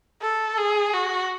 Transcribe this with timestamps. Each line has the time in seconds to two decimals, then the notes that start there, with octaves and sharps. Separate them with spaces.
0.22 A4
0.58 G#4
0.94 F#4